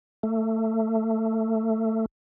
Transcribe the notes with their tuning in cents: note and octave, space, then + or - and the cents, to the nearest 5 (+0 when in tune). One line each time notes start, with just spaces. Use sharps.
A3 +20